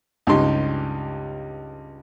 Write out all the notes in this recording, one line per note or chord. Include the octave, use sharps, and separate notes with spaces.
C#2 G2 C#4 D#4 G4 C6